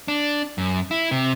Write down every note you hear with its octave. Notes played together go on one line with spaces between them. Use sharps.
D4
F#2
E4
C3